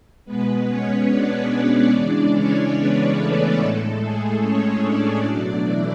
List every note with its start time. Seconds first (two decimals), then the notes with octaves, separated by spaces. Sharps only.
0.25 B2 G#3 B3 B4
0.67 C#4 C#5
1.08 D4 D5
1.50 D4 D5
1.91 C#3 E3 G#3 D4 D5
2.32 C#4 C#5
2.74 B3 B4
3.15 A3 A4
3.56 A2 G#3 A3 A4
3.98 G#3 G#4
4.39 C#4 C#5
4.81 D4 D5
5.22 B2 F#3 A3 D4 D5
5.64 E3 E4